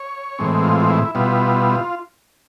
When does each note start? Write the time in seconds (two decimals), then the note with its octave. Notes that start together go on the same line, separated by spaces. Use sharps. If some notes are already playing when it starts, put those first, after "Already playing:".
Already playing: C#5
0.39 A2 E3 G#3 C4
0.64 F4
0.80 F4
0.90 E4
1.15 B2 G3 B3 E4 F4